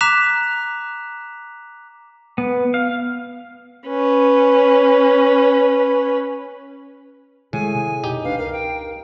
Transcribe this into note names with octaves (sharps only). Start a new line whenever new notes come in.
A#5 D6 F#6 B6 E7 F7
B3
F5
C#4 B4
A2 C3 D#3 G#3 G#4 G#5
C3
F2 B2 D#4 G4
D1 G#1 D4 B4 F5
C#2 A#4 F5
G5